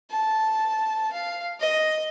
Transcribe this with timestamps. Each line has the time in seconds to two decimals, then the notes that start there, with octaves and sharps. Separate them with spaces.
0.11 A5
1.13 F5
1.60 D#5